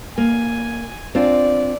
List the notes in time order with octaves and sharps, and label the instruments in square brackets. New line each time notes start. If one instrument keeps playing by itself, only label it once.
[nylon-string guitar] A#3 [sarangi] G#5
[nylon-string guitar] C4 D4 F4 [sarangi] D5